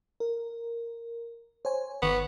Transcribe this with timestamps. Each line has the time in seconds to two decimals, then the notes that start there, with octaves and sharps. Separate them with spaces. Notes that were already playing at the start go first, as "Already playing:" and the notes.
0.20 A#4
1.65 C5 C#5 G#5
2.02 G1 D#3 B3 C#6